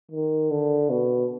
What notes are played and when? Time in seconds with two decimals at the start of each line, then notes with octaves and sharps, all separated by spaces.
0.11 D#3
0.51 D3
0.90 B2